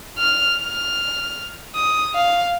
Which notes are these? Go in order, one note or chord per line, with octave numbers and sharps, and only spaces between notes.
F6
F6
D#6
F5